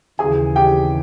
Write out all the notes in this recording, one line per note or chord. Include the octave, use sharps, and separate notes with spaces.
D#2 C#3 E3 G#4 G#5
G4 G5